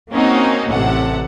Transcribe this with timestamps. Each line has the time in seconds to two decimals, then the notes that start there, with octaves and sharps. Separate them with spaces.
0.13 A#3 C4 C#4 D#4 F#4
0.71 A1 C3 A4 F#5